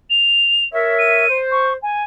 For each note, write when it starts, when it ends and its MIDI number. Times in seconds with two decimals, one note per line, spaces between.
0.10 0.65 101
0.74 1.28 70
0.74 1.28 73
0.74 1.28 76
0.98 1.37 99
1.29 1.75 72
1.51 1.73 85
1.82 2.04 80